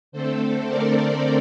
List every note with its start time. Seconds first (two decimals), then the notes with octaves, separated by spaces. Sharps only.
0.12 D3 A3 C4 A4 C5
0.67 A#4 D5